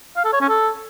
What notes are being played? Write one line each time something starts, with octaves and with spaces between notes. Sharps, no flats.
F5
A4
C#5
C#4
A4